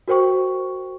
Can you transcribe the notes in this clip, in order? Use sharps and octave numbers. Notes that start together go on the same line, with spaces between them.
F#4 A#4 C5 G5 C#6